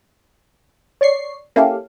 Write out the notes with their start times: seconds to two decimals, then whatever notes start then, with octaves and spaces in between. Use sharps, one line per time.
1.01 C#5 D5 C#6 C7
1.56 A#3 C#4 E4 G4 A4 F5